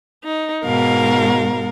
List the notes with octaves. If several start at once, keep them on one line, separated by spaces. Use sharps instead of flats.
D#4
G#2 B2 A#4 F5